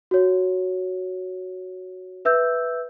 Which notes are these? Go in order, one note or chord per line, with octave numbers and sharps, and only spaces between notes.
F#4 C#5
B4 E5 E6 G6